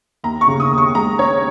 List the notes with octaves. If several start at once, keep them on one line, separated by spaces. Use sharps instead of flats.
D#2 A#5
C#6
C#3
D#6
D#2
C#6
G#3 A#5
C#4 C#5